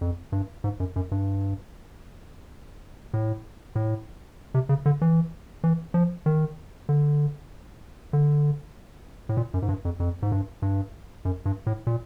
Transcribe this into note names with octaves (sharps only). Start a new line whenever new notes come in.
F2
G2
G#2
F#2
F#2
G2
A2
A2
C3
C#3
D3
E3
E3
F3
D#3
D3
D3
A2
A#2
F#2
G#2
G2
F2
F2
G#2
G2
G2
F#2
G2
A2
A#2